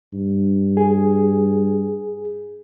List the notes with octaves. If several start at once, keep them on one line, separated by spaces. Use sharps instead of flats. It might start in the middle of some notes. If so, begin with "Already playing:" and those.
G2
G#4